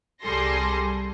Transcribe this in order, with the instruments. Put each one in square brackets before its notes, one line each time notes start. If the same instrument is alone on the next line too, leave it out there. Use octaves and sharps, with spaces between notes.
[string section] C2 G3 G#4 A4 C6 A#6